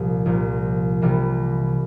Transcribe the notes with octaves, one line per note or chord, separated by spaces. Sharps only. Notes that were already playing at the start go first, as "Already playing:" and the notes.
Already playing: C2 A#2 F3
C2 A#2 F3
C2 C3 E3 A#3